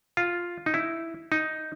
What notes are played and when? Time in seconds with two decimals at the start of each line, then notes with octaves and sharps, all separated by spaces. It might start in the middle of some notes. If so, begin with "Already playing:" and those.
0.17 F4
0.66 D#4
0.74 E4
1.32 D#4